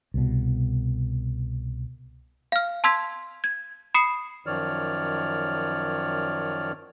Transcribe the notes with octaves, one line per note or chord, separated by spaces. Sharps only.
C2 B2
F5 F6
A5 C6 E6 G#6 B6
G#6
B5 D#6 C7 C#7
F#2 D#3 F3 C#5 D5 F6